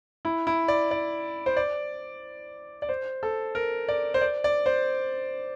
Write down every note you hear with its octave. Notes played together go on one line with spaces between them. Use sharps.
E4
E4
D5
D5
C5
D5
D5
C5
A4
A#4
D5
C5
D5
D5
C5